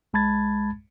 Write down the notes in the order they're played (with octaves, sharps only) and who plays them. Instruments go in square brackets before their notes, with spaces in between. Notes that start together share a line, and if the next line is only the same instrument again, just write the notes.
[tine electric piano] B1 G#3 A5 B5 G#6 A6